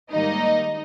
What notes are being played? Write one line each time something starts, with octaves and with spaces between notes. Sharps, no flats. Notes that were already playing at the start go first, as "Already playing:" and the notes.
G#2 D#3 G3 A#3 D#4 D#5